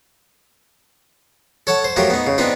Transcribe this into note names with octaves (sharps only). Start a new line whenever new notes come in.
A4 C#5 F#5 A5
C5
F3 F#3 A3 F4 G4 A#4
B3 D#4
C#3
B3 C4 D4 D#4 F4 B4